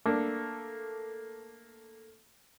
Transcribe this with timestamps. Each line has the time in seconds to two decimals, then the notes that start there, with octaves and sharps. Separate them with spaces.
0.06 A3 A#3 D4 A4